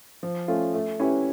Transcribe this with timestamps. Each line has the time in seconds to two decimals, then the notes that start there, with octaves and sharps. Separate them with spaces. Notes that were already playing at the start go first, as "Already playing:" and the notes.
0.23 F3
0.48 A3 C#4 F4
0.74 A3
1.00 C#4 E4 G4 B4